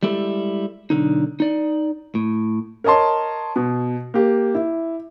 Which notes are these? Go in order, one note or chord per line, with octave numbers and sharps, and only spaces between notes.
G3 G#3 E4 G4 A4
B1 D3 D#4
D#4 D5
A2
A#4 C#5 D#5 A5 C6
B2
A#3 G4
E4